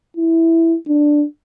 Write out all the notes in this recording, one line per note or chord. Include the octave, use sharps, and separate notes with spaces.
E4
D4